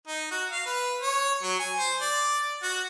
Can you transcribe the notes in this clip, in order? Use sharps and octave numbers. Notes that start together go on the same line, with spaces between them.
D#4
F#4
F5
B4
C#5
F#3
G#5
C5
D5
F#4